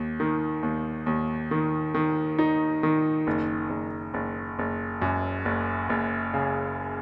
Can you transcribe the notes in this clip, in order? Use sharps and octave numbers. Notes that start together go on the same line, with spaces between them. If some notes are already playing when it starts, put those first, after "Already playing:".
Already playing: D#2
D#3
D#2
D#2
D#3
D#3
D#4
D#3
F#1
F#1
F#1
F#1
F#2
F#1
F#1
C#3